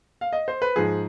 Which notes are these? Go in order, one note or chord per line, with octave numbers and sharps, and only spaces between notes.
F5
D#5
C5
B4
G#2 F3 G#4